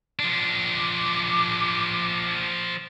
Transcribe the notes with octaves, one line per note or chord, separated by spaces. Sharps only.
F3 D4
D6